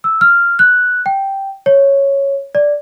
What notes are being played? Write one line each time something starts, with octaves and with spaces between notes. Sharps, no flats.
E6
F6
F#6
G5
C#5
D5